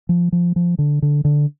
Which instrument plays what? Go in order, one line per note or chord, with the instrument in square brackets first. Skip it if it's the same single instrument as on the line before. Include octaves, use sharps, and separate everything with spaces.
[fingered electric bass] F3
F3
F3
D3
D3
D3